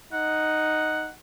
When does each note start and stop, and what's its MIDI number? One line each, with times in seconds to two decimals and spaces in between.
0.13 1.11 63
0.13 1.11 78